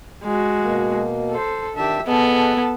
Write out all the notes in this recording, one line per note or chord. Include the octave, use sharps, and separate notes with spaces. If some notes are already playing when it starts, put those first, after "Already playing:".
G#3 F#4
B2 A#3
A4 C5
D#3 D4 G4 E5 A5
B3 G#4 A4 B4 D#5 A5